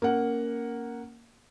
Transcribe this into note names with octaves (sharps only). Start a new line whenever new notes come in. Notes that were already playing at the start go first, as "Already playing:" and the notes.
A#3 C#4 F#5